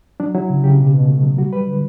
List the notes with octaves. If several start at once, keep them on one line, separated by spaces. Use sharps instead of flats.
F#3 D4
F#3 E4
C#3
C#3 G4
B2
B2
A3
F#3
G3 F#4
G3 B4
D3